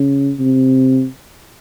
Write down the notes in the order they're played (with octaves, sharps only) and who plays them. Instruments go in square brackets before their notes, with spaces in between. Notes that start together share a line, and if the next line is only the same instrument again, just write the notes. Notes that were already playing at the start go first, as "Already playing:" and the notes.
Already playing: [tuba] C#3
C3